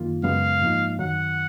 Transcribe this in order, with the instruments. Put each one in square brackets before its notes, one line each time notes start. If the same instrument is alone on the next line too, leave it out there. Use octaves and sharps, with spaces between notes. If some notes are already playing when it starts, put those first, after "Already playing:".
Already playing: [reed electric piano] F#2 D#3 A#3 F4
[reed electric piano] F#2 C#3 G#3 B3 [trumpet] F5
[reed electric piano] G#2 F3 A#3 D#4
[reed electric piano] F#2 D#3 F#3 [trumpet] F#5